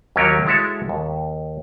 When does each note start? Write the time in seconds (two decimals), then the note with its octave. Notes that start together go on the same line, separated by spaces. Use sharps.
0.16 D#2 F#3 A#3 F4 G4 C#5
0.46 G#3 E4 F#4 A4 C#5 E5
0.89 D#2